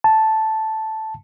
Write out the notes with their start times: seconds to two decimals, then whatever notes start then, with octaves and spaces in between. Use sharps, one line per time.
0.04 A5